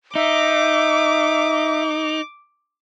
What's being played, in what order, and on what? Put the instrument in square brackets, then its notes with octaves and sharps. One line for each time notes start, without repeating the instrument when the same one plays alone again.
[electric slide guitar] D#4 [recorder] E5 [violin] D6